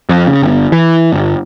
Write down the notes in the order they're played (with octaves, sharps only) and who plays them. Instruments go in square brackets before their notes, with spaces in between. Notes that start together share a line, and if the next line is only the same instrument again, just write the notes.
[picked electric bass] F2
C#3
G1
E3
G1